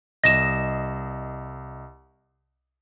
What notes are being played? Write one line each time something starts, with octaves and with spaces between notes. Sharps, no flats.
C2 D#5 A#6 E7